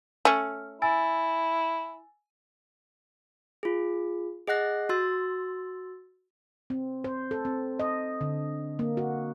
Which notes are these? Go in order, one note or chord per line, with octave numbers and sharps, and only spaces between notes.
A3 C#4 F6
E4 G#5 E6 A6
F4 G#4
G#4 D#5 F#5 F#6 A#6
F#4 C6 E6 A6
C4
C5
A4
C4
D#5
D3
A#3
F#4